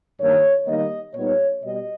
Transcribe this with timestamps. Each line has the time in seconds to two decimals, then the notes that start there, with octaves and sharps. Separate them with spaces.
0.19 G2 D#3 A#3 C#5
0.67 D#3 G3 A#3 D#4 D#5
1.14 A#2 G3 B3 D#4 C#5
1.62 B2 G3 D#5